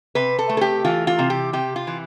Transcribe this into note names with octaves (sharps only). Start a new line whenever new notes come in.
C3 B4
A4
A3
A4
G4
E3 F4
F4
C3
G4
C3 G4
F4
E3